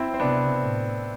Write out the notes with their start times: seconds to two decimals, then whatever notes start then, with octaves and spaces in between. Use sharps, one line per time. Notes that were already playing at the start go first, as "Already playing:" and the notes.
Already playing: C4 E4
0.14 C4
0.20 C3 B3 D4
0.60 A2